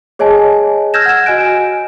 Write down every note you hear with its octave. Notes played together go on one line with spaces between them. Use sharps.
G#4 C#5 D#5 G#5 A5
E6 F6 G6 G#6 A#6 E7
F#5 G#6 E7
F#4 D#5 G#5 F#6 D7